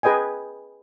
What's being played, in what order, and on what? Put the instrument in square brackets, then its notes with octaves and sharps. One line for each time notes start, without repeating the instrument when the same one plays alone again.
[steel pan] G#4 B4 D#5 G5 G#5